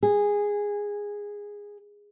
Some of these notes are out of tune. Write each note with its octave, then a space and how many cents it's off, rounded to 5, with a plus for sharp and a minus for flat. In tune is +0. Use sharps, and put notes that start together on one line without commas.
G#4 -10